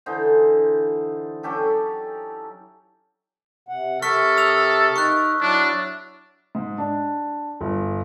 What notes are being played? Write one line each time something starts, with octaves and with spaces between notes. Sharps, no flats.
D3 E3 D#4 C5
F#3 C#4 G4 A4
C3 F#5
C3 G4 A4 A#4 C#6 F6 B6
D#6 E6 F7
D#4 A#4 A#5 C#6 F#6
F#3 D4 E4
G#2
D4
G1